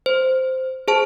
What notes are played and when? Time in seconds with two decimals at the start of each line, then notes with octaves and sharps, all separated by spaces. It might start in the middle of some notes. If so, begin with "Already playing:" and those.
0.06 C5
0.88 G#4 C5 A5